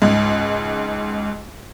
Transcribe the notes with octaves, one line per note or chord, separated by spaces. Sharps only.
C#2 G#2